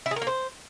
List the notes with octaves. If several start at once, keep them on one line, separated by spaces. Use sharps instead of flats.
E4
G#4
A#4
A#3
C5